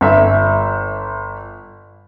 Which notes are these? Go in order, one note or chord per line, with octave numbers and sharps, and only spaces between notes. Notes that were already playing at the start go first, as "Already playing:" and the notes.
G1 E5